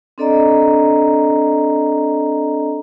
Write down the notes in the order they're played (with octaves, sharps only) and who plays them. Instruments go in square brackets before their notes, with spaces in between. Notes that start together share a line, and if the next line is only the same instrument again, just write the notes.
[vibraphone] C4 D4 A4 D5 D#5 A#5